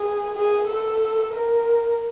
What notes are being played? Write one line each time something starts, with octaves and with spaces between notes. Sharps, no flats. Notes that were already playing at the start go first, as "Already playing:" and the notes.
Already playing: G#4
G#4
A4
A#4